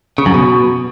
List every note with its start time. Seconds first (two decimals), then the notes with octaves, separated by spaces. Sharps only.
0.18 C#3
0.26 F#2
0.34 B2